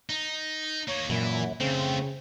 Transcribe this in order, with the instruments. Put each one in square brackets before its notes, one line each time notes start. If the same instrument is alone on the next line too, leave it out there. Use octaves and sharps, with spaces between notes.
[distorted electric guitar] D#4
[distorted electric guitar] A#3 D#4 [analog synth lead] C#5
[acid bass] F#2 [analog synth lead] A#2 [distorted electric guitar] E3 E4
[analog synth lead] C#3 [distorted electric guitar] A3 F4 [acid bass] C4